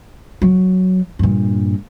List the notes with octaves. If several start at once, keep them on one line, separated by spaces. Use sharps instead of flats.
F#3
G2 A#2